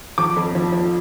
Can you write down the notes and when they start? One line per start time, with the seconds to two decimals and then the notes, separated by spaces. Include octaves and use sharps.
0.18 F3 D6
0.36 F2
0.55 F3
0.72 F3